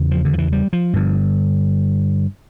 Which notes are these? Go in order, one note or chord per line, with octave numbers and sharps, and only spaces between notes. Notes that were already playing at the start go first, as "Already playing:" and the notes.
Already playing: E2 C#3
F3
D3
F3
E3
G3
F3
G2 D3